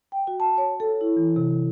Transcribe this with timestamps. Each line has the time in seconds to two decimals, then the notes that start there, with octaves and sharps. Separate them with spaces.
0.12 G5
0.27 F#4
0.40 A5
0.58 C#5
0.80 A4
1.01 E4
1.17 E3
1.36 C3